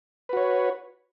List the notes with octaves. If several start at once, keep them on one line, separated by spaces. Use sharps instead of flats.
F#4 B4 C#5